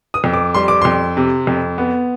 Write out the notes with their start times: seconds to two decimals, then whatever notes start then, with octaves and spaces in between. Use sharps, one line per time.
0.14 D#6
0.24 F2
0.34 D6
0.54 G3 C6
0.68 D6
0.82 F2 C6
1.17 C3
1.47 F2
1.78 B3